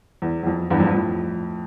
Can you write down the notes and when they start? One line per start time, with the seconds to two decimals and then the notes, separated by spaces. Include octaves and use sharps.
0.22 E2
0.43 E2
0.47 F2
0.71 E2 G2
0.80 F2
0.87 G2
0.94 F2 A2